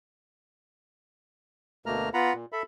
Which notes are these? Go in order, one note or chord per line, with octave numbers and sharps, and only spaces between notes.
D2 B2 A3 A#3 A#5 F6
B3 F4 F#5 A#5 B5
A#2
A4 E5 B5